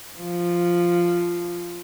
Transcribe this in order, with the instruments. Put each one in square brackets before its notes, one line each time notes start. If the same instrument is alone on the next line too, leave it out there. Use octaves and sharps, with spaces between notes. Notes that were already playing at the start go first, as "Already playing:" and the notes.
[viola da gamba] F3